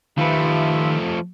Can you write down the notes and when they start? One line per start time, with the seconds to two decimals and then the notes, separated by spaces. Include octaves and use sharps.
0.18 D#3 F3 A3 F4 G4 B4 E5